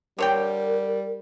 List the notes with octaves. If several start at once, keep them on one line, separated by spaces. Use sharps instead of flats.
D3 G3 A#4 C#5 G5